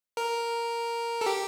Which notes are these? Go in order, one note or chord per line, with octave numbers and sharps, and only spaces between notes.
A#4
A4
G4